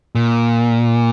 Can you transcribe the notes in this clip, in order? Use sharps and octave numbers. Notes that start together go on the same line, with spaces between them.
A#2